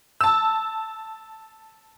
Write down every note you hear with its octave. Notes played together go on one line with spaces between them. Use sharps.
A5 E6